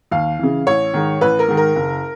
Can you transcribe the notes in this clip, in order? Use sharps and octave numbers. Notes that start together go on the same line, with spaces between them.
D#2 F5
C#3 E3
A1 C#5
G#2 D#3
A1 B4
A#4
G#2 D#3
A#4
F#1